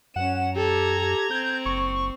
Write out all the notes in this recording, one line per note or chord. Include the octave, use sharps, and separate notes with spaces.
F#2 C#4 F#5 E7
G4 A4 A#5 G#6
C4 G6
F#1 C#6